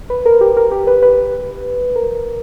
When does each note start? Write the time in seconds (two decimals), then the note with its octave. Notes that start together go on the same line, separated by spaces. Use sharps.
0.10 B4
0.26 A#4
0.41 G4
0.57 A#4
0.72 G4
0.87 B4
1.03 B4
1.96 A#4